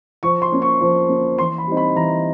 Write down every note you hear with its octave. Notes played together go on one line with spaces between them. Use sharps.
F3 C#6
C6
A#3 C#4
C#6
F3
A#3 C#4
E3 C6
B5
G3 C4 D#4
B5
E3 A#5